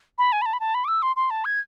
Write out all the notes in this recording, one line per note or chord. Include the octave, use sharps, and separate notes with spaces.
B5
G#5
B5
A5
B5
A5
B5
D6
E6
C6
C6
A5
G#6